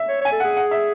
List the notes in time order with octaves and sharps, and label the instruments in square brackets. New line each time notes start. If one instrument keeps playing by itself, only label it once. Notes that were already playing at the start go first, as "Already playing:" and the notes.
Already playing: [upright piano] E5
[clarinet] C#5
[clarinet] C#5 [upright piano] G#5
[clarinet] A4
[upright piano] F#5
[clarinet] G#4
[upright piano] F#5
E5